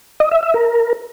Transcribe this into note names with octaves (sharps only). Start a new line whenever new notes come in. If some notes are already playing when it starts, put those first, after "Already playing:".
D#5
E5
E5
A#4